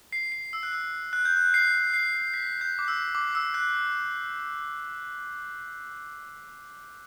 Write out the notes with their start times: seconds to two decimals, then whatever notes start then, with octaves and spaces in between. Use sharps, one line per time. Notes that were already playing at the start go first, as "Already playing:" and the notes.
0.13 C7
0.32 C7
0.53 E6
0.63 F#6
0.73 E6
1.13 F#6
1.25 G6
1.37 F#6
1.54 C7
1.94 C7
2.34 B6
2.61 G6
2.79 D6
2.88 E6
3.15 D6
3.35 E6
3.54 F#6